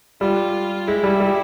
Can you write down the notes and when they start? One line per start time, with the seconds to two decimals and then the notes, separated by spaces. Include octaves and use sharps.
0.21 G3 F4
0.87 G#3 E4
1.04 G3
1.20 G3